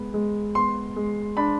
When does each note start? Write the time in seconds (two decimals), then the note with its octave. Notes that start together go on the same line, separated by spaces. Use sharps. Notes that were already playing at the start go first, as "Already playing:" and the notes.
Already playing: G#3 B3
0.14 G#3
0.55 B3 C6
0.96 G#3
1.37 D4 B5